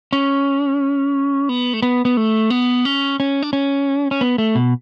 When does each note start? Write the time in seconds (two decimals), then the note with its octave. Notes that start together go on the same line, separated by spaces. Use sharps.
0.13 C#4
1.49 B3
1.73 A3
1.82 B3
2.05 B3
2.17 A3
2.50 B3
2.85 C#4
3.20 C#4
3.42 D4
3.53 C#4
4.11 C#4
4.21 B3
4.38 A3
4.55 B2